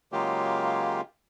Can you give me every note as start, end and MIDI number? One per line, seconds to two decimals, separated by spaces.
0.12 1.01 49
0.12 1.01 54
0.12 1.01 56
0.12 1.01 58
0.12 1.01 65
0.12 1.01 67